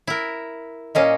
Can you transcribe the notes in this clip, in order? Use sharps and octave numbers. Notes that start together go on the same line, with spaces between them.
E4 A#4
A#2 A#3 C#4 D#5